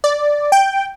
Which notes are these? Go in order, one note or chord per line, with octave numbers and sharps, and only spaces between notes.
D5
G5